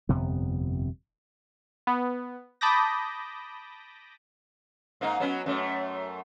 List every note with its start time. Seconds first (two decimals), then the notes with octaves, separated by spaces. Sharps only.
0.09 G1 F2 C3 B3
1.87 B3
2.61 A5 B5 D6 D#6 G6 A#6
5.01 G#2 A#3 D#4
5.20 F#3 B3 C#4
5.46 F#2 A3